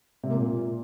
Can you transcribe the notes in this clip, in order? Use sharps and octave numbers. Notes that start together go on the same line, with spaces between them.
C3
A#3
A#2